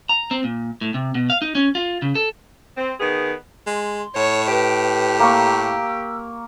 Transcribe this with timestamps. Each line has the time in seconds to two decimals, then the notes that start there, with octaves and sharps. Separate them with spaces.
0.09 A#5
0.31 C4
0.44 A#2
0.81 A2
0.94 C3
1.15 B2
1.30 F5
1.42 D#4
1.55 C#4
1.75 F4
2.02 C#3
2.15 A4
2.76 C4
2.99 D#3 B3 G#4
3.67 G#3 C6
4.16 A2 C#5
4.51 G4 B4
5.20 A#3 C#6 E6